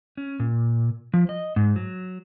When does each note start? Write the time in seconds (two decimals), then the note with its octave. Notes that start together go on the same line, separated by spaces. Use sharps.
0.17 C#4
0.40 A#2
1.14 F3
1.29 D#5
1.56 G#2
1.76 F#3